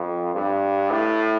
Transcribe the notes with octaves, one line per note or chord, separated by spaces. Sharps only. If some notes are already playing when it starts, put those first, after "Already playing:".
Already playing: F2
G2
A2